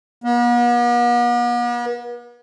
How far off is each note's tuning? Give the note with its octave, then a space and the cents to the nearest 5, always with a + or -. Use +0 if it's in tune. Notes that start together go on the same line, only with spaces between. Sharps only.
B3 -45